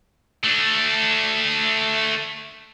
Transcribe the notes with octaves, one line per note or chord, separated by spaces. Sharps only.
A3 D4